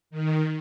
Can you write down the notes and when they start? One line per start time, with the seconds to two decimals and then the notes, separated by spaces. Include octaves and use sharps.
0.10 D#3